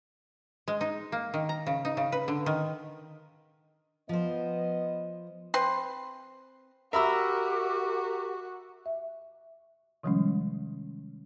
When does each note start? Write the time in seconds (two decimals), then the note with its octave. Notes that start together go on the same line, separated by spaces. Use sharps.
0.68 G#3
0.81 D#4
1.12 A#3
1.34 D#3
1.49 A#5
1.67 C#3
1.85 D#4
1.97 C#3
2.12 B4
2.28 D3
2.46 D#3
4.09 F3 B3 C5 D#5
5.54 C4 B4 C6
6.93 F#4 G4 A#4 E5 B5 E6
8.86 E5
10.03 C3 D#3 F3 G3 G#3 C#4